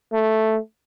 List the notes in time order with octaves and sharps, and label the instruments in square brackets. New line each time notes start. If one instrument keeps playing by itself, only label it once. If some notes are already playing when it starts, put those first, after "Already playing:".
[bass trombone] A3